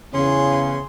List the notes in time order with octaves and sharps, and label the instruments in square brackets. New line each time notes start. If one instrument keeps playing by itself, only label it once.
[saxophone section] E2 C#4 [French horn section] C#3 [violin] G#4 C6